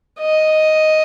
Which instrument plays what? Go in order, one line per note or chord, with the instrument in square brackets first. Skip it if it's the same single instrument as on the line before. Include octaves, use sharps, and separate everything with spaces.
[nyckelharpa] D#5